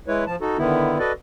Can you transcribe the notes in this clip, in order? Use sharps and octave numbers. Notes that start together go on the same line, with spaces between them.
G#3 E4 B4 C#5
F3 A5
D#4 F#4 A4
D3 D#3 B3 E4
F#4 A4 B4 D5 D#5